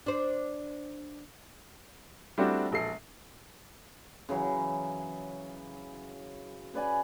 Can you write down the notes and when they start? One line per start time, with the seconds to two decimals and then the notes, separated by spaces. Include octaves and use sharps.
0.06 D4 C5
2.38 G3 A3 C4 D4 E4 F#4
2.71 E1 A#1 A4 C7
4.29 C#3 E3 F#3
6.74 C#3 B4 D5 G#5